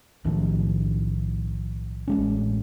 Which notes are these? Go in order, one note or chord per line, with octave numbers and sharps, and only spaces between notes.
B1 A2 D#3 F3
A1 G#3 C#4